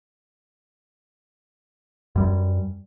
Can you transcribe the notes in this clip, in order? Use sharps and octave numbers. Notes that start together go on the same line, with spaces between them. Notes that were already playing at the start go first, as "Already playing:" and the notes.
F#2 G3